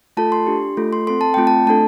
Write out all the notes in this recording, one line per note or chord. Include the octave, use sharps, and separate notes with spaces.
A3 F4 A4 A5
C6
D4 G4
A3 F4 A4
C6
C4 A4 C6
A5
A3 C4 F4 G5
A5
A3 D4 A4 A5